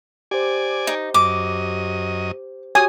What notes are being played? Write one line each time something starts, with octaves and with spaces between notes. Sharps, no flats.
G4 C5 D5 G#5
D#4
F#2 D#5 D6
F#4 G4 C#5 G#5 D#6